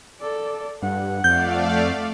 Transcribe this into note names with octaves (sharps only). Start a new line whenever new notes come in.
A4 D5
G2 F#5
F2 A3 D5 F5 G6